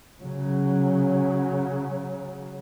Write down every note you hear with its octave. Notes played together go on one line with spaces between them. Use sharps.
C#3 F#3